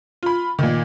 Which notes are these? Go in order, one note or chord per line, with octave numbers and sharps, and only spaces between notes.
F4 B5
A#2 D#3